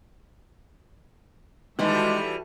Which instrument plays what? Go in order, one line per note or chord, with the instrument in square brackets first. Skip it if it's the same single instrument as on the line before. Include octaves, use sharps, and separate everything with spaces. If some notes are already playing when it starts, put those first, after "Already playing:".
[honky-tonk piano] D#3 [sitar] E3 G3 [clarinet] G#3 [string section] F#4 A4 E5